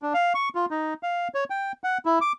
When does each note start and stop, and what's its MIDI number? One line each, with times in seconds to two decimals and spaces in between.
0.02 0.13 62
0.14 0.33 77
0.35 0.49 85
0.55 0.66 65
0.71 0.94 63
1.03 1.28 77
1.34 1.44 73
1.50 1.72 79
1.84 1.98 78
2.05 2.19 64
2.21 2.32 86